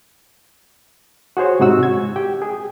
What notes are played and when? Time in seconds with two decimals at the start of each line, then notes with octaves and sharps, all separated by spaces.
1.37 F#4 G#4 C5 C#5
1.60 G#2 C3 D#4 F#4 E6
1.83 G#6
2.16 G4 G5
2.42 G#4